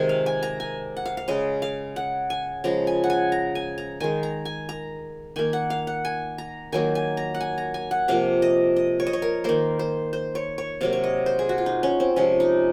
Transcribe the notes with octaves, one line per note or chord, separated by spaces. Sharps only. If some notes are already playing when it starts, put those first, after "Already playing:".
Already playing: C3 D#3 G#3 G#5
F5
G#5
A#5
G#5
F#5
F5
F5
C#3 G#3 D#5
F5
F#5
G#5
C#3 F3 G#3 A#5
G#5
F#5
G#5
A#5
G#5
A#5
D#3 G#3 G#5
A#5
G#5
A#5
D#3 A#3 G#5
F#5
F5
F#5
G#5
A#5
D#3 F#3 A#3 G#5
G#5
A#5
F#5
G#5
A#5
G#5
F#5
C3 F3 A#3 F5
D#5
D#5
C#5
D#5
C#5
A#4
D#3 A#3 C5
C5
C5
C#5
C#5
C3 F#3 A#3 F5
C#5
D#5
C5
G#4
F#4
F4
D#4
C#4
C4
C3 F3 G#3 C#4
D#4